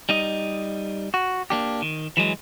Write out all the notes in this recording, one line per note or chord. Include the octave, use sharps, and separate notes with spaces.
G3 D#4 D#5
F#4
A#3 D4 G4
D#3
E3 F#3 G#3